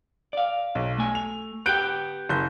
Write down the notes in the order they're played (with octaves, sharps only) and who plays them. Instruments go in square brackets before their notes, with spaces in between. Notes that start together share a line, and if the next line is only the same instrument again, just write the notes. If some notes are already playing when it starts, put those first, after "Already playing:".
[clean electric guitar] D5 F5
[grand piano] B1
[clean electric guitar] A3 G#5
[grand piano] F7
[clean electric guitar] B3 G4 G5 [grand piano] F#6 G6 D7
[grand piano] F#1 G6